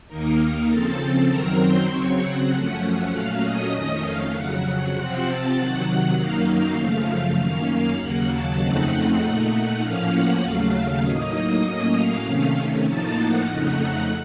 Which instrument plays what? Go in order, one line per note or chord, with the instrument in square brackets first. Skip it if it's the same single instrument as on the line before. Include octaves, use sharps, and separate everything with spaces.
[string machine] D#2 D#3 A#3 D#4 A#4
C#3 F3 C4 A4 A5
F#2 D#3 F#3 C4 A#4 A#5
C5 C6
C#3 F#3 C4 C#5 C#6
F#5 F#6
F#2 F3 A3 C#4
F#5 F#6
A#2 F#3 A3 C#4 F5 F6
D#5 D#6
F2 D#3 A3 C#4
F5 F6
F2 C#3 F#3 F#5 F#6
F#5 F#6
C3 F3 C4
A5 A6
C3 D#3 F#3 F#5 F#6
F#2 D#3 F#3 A#3 D#4 F5 F6
F5 F6
F#2 C#3 F3 A3
F#2 D#3 A#3 C#4
F5 F6
D#2 C#3 F#3 A#3 F#5 F#6
A5 A6
F2 C#3 A3 C4 D#4 F#5 F#6
A#2 A3 D#4
F#5 F#6
A2 F3 A#3 C#4 F5 F6
F#5 F#6
D#2 C#3 F#3 A3 F5 F6
A2 F#3 A#3 D#4 D#5 D#6
A2 F#3 A#3 C#4 D#5 D#6
F5 F6
C3 D#3 A3 C#4
A2 F3 A#3 D#4 A5 A6
F#5 F#6
F2 C#3 A3 D#4
F#5 F#6